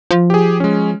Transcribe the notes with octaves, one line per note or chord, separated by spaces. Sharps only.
F3
G4 G#4
G#3 C#4